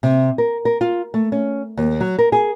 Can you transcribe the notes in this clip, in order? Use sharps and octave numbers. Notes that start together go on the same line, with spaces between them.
C3
A#4
A#4
F4
A3
C#4
D#2
F#3
A#4
G#4